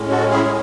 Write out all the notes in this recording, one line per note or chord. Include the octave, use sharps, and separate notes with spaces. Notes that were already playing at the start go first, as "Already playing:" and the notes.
Already playing: A2 G#3 C#4
F#4 A4
E4 G#4
G#4